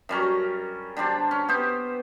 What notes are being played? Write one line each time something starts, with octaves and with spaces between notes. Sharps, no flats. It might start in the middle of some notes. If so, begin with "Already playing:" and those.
F#2 G3 C#4 A#5
D3 G3 D4 C5
C#4
B3 G4 C5